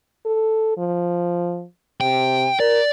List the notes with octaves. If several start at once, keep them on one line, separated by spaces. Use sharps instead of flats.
A4
F3
C3 G5
A#4 D5